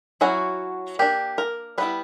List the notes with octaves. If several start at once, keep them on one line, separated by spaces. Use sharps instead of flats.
F#3 C#4 E4 F#4
A#3 D4 G4
A#4
G3 B3 E4 B4